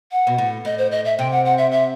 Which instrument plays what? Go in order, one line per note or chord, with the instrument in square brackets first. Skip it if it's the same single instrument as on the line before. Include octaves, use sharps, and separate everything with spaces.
[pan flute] F#5
[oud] B2
A2
[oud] A2 [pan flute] D#5
[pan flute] C5
D#5
E5
[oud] C3 [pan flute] G5
[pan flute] F#5
F#5
E5
E5